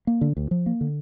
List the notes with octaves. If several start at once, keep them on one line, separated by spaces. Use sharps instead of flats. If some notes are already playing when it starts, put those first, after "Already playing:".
A#3
D3
D2
F3
A#3
D3